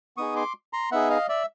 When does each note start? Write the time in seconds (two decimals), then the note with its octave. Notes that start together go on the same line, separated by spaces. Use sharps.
0.17 B3 D#4 G#4 C#6 D#6
0.36 C6 D6
0.73 A#5 C6
0.91 B3 D#4 G#4 E5 F#5
1.10 D#5 F5
1.29 D5 E5